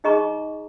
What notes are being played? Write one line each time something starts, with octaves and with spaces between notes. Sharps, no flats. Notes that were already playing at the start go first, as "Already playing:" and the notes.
D#4 G#4 D#5 A#5 C#6